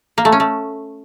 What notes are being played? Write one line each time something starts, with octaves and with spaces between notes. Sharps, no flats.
A#3
A3
C#4
A3